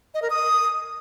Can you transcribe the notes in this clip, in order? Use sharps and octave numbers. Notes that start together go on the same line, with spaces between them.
D#5
A#4
D#6